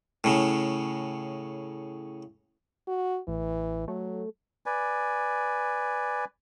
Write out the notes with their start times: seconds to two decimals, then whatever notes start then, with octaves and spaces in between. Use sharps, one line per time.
0.24 A2 C#3
2.88 F#4
3.28 A1 E3
3.88 F#3 A3
4.66 B4 D5 G#5